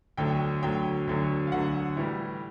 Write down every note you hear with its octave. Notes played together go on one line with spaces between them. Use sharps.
D2 D3 F#3 G5
D2 D3 F#3 G5
D2 D3 F#3
F5
D2 D3 F#3 F#5
A2 E3 G3